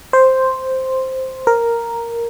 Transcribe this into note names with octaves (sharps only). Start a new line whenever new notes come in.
C5
A#4